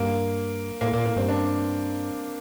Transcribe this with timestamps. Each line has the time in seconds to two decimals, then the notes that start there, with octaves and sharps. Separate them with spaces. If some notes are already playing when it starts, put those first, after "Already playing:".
Already playing: G2 A#3
0.81 A2 A#3
0.93 A#2 A#3
1.05 A2 A#3
1.16 G2 C4
1.28 D4